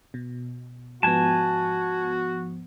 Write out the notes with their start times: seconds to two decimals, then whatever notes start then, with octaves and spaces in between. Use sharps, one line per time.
0.14 B2
1.03 G#2 F3 B3 F#4 G#5 A5